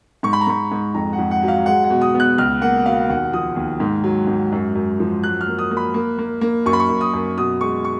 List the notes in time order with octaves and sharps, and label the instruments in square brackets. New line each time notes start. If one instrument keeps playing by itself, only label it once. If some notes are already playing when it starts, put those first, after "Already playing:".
[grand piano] G#2 C#6
B5
A#5
G#2 B5
G#2
F2 A#5
F#5
F2
F#5
F#3
F5
G#3 F#5
F#5
B2
D#6
B3
F#6
C#2 F6
A#3 F#5
B2 F5
D#2 F#5
F3 D#6
D#2
G#2
F#3
G#2
F#2
F#2
F3
F#3 F#6
F6
A#3
D#6
A#3
B5
A#3
A#3
A#3
F#2 C#6
B5
C#6
F#2
D#6
F#2
B2 D#6
G#3 C#6
C#6